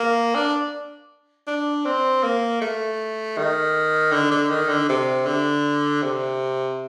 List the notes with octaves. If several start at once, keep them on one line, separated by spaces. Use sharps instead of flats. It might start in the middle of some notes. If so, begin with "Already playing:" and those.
Already playing: A#3
D4
D4
C4
A#3
A3
D#3
D3
D3
D#3
D3
C3
D3
C3